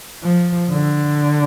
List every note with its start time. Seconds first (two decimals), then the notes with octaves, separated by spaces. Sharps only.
0.23 F3
0.71 D3